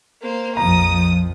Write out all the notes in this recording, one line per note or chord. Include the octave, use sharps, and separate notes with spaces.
A#3 C5
A#1 F2 F3 A#5 D#6